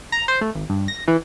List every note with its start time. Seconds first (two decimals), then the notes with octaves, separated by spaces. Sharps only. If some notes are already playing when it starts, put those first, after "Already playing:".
0.12 A#5
0.28 C5
0.41 A3
0.55 G#1
0.69 G2
0.88 A#6
1.08 E3